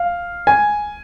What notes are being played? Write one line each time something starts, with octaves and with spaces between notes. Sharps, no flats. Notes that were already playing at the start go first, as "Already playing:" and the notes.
Already playing: F5
G#5